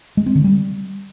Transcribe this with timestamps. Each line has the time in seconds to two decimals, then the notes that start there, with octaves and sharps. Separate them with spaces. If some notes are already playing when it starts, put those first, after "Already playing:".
0.17 G#3
0.26 C4
0.35 D3
0.44 G3